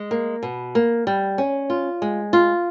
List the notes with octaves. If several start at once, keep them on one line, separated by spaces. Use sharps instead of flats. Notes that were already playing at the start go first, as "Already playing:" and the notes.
Already playing: G#3
A#3
B2
A#3
G3
C#4
F4
G#3
F4